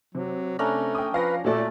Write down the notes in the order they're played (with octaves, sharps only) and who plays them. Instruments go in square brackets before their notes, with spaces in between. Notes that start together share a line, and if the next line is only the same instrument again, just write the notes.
[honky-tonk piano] C3 [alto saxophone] F#3
[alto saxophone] A3 [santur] C#4 D4 A#5
[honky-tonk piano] G5 D#6
[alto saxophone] F3 [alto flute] B4 [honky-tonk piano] F5 A#6
[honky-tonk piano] A#2 F#4 D5 [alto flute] A3 [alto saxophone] A4